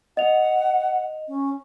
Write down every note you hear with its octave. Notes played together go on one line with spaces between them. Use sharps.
D#5 F#5 F7
C#4